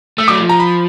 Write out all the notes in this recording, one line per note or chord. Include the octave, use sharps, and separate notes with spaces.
A3 E6
F#3 D6
F3
A#5
B5